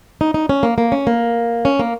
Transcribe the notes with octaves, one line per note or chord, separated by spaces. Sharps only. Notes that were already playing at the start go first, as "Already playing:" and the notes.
D#4
D#4
C#4
A#3
A#3
C#4
A#3
C#4
A#3